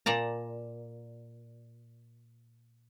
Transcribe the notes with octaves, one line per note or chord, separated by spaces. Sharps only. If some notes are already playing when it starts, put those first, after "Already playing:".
A#2 D5 A5 A#5